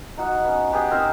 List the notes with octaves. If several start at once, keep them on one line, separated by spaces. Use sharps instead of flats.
D#4 F#4 F#5
B3 C#4
B3 G4 G#4 F#5
C4 D#4 A#4 C5